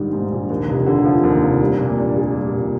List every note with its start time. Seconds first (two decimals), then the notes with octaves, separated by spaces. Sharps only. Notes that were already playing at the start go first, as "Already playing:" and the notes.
Already playing: A#1 G#2 D#3 G3
0.13 G#2
0.32 A#1
0.50 D#2
0.68 F1
0.86 D3
1.05 F3
1.23 D#2
1.42 F1
1.61 G3
1.79 A#2
1.98 D4
2.17 G#4
2.35 G3
2.53 A#2